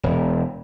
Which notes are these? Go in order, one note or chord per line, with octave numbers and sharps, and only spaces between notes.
E1